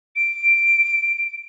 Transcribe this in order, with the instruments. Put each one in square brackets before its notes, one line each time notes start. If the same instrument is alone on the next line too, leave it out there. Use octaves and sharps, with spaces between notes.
[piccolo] D7